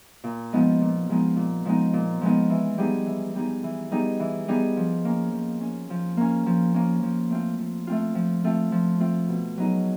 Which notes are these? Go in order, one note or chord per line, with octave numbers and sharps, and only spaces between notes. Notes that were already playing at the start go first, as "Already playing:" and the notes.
A#2
F3 G#3 B3 D#4
A#2
F3 G#3 B3 D#4
A#2
F3 G#3 B3 D#4
A#2
F3 G#3 B3 D#4
E3
G3 B3 D#4 G#4
E3
G3 B3 D#4 G#4
E3
G3 B3 D#4 G#4
E3
G3 B3 D#4 G#4
F3
A#3 C#4
F3
A#3 C#4
F3
A#3 C#4
F3
A#3 C#4
F3
A3 C4 F4
F3
A3 C4 F4
F3
A3 C4 F4
F3
A3 C4 F4
B2
F#3 B3 D#4 G#4